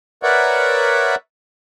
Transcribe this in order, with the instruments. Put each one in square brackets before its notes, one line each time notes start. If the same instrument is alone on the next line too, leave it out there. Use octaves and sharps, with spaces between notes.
[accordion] A#4 B4 C#5 D5 E5 F#5